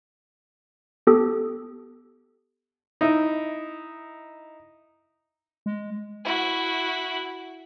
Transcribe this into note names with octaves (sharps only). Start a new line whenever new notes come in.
B3 G4 A4 D#6
D#4 E4
G#3
E4 F#4